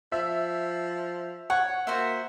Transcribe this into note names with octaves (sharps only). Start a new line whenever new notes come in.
F3 E5
C#5 F#5
A#3 F#4 C5 E5